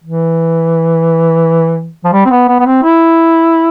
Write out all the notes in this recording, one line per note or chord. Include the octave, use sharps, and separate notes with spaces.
E3
F3
G3
C4
B3
B3
B3
C4
E4